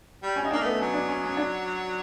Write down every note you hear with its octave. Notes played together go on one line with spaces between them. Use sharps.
G3
C#4
G3 D#4
A#3 D4
A3 B3
F#3 C#4
D4
C#4
C#4
D4